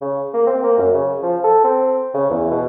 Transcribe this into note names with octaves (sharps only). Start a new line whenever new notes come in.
C#3
A#3
C4
A#3
F#2
C#3
F3
A4
C4
C#3
E2
B2